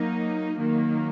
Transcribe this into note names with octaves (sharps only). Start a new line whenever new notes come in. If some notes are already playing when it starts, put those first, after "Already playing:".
Already playing: F#3 A#3 D#4
D#3 F#3 A#3